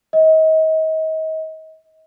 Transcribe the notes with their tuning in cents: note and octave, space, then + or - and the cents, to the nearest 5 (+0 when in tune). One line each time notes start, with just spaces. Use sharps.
D#5 +35